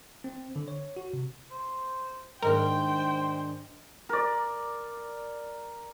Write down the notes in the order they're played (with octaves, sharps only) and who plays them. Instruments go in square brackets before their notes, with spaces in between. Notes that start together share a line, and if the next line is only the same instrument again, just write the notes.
[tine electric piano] C4
D3
C#5
F#4
C3
[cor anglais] C5
[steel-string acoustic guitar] G#2 D#3 D4 [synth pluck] A#4 [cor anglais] C5 [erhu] G5
[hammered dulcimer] A#4 D5